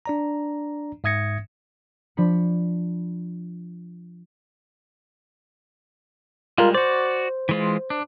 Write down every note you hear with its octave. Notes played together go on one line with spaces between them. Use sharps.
D4 D5 A#5
G#2 E5 D#6 G#6 A#6 C#7
F3 D4 B5 C#7
G3 G#3 F4 A#4
F#4 C5 D5
E3 G#3 F4
D4